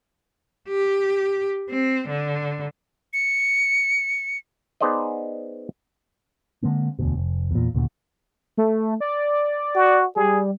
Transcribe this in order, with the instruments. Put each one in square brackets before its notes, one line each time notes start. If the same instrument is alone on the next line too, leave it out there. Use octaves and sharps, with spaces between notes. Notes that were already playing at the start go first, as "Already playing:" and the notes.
[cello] G4
C4
D3
[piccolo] C#7
[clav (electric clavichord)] B3 D#4 G#4 C5 D5 D#5
[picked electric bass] D3 G#3 A#3 C4
E1 D2 B2
F1
E2 A#2
D2 A#2 C#3
[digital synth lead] A3
D5
[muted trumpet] F#4
[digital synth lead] G3 [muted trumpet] G#4